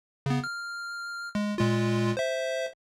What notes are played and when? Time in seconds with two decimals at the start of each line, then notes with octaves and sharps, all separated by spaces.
0.26 C#3 B3
0.44 F6
1.35 G#3
1.58 A#2 G#3 F4
2.17 C5 E5